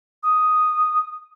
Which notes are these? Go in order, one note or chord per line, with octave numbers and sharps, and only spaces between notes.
D#6